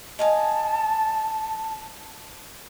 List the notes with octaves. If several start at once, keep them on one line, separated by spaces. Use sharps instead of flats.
D#5 F5 G#5 A5